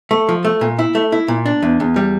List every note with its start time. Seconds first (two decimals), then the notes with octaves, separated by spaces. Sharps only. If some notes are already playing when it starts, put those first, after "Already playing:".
0.11 A3
0.29 F3
0.45 A3
0.61 A#2
0.79 E4
0.95 A3
1.12 E4
1.28 A#2
1.46 D4
1.62 E2
1.80 E2
1.96 G3